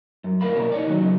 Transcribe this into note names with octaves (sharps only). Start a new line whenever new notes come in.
F#2
D2 A2 A#4 F5 B5
B2 A#3 A#4 C#5
D#4 C#5 D5
D#3 F#3
E2 C#3 F#3